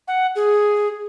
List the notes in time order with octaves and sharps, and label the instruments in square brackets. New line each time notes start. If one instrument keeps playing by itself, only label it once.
[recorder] F#5
G#4